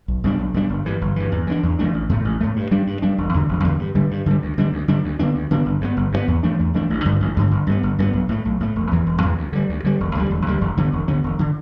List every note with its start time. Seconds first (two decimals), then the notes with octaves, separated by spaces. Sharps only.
0.08 B1
0.24 B2 G3 D4
0.39 B1
0.54 B2 G3 D4
0.69 G1
0.85 G2 E3
1.01 G1
1.16 G2 E3
1.32 E2
1.47 E3 A3 D4
1.63 E2
1.79 E3 A3 D4
1.94 A1
2.09 A2 A3
2.25 A1
2.40 A2 A3
2.56 G2
2.71 G3 D4
2.87 G2
3.02 G3 D4
3.18 E1
3.34 E2 D3
3.49 E1
3.64 E2 D3
3.79 G2
3.95 D3 G3
4.11 G2
4.26 D3 G3
4.42 D2
4.58 D3 G3 D4
4.73 D2
4.88 D3 G3 D4
5.04 D2
5.19 D3 B3 D4
5.35 D2
5.51 D3 B3 D4
5.66 G1
5.81 G2 E3 B3
5.97 G1
6.12 G2 E3 B3
6.28 E2
6.43 E3 A3 D4
6.59 E2
6.74 E3 A3 D4
6.90 A1
7.05 G2 D3
7.20 A1
7.36 G2 D3
7.51 G1
7.67 G2 G3 B3
7.83 G1
7.99 G2 G3 B3
8.13 B1
8.29 A2 A3
8.45 B1
8.60 A2 A3
8.76 E1
8.91 E2 E3
9.06 E1
9.23 E2 E3
9.38 D2
9.53 D3 G3
9.69 D2
9.84 D3 G3
10.00 E1
10.15 D2 D3 G3
10.30 E1
10.47 D2 D3 G3
10.61 E1
10.77 D2 D3 B3
10.93 E1
11.08 D2 D3 B3
11.24 E1
11.39 D3